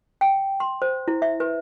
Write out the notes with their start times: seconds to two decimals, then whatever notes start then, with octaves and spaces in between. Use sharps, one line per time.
0.21 G5
0.60 C6
0.82 C5
1.08 E4
1.22 E5
1.40 B4